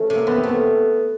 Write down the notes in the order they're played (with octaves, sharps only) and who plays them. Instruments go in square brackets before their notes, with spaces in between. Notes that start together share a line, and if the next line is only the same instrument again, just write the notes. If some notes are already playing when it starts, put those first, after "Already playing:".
Already playing: [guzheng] E3 A3 [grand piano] C#4
[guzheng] C3
[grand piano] A#3
[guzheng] E3 [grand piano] B3
[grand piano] C4
[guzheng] A3
[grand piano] B3